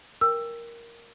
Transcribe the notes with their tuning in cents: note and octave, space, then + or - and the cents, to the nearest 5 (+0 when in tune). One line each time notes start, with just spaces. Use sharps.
A#4 +0 G5 +20 E6 +15